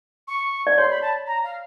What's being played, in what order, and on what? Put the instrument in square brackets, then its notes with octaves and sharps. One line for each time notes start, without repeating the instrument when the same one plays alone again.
[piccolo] C#6
[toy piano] D5
[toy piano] C#5 [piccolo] C6
[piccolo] B5
A5
A#5
F5